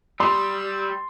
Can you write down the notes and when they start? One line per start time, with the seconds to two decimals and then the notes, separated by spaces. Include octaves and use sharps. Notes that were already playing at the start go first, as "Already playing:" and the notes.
0.20 G3 C6 E6